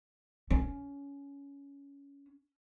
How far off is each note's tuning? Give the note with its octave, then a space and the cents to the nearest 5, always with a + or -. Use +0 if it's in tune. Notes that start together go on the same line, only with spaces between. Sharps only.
C#4 +20